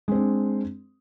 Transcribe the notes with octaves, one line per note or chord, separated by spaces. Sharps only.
G#3 C4 D4